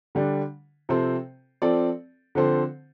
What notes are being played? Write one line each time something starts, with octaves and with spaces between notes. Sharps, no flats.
D3 G3 D4
C3 F3 C4 A4 C5
F3 C4 A4 D5
D3 F3 C4 A4 C5